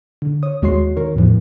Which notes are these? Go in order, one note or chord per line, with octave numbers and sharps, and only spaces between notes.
D3
C#5 D#6
D#2 G#3 F#4 C#5 C6 C7
D#3 A#4 C#5
E2 A2 E3 F3